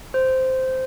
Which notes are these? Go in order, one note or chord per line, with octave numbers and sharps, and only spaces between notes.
C5